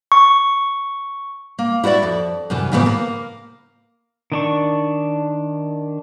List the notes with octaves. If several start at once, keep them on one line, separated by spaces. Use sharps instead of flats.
C#6
A#3
E4 F#4 C5 D5 E5
F2
F#2 C3 E3
G#2 C#3 E3 F3 B3 C4
A#3
D#3 D4 C#6